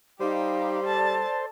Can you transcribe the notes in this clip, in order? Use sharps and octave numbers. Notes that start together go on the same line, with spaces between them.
G3 D#4 G4 C5 F5
A4 D5 A5